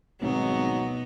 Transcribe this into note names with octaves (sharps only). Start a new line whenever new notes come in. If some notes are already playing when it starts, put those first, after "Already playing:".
G#1 B2 F3 F#3 A3 B3 D#4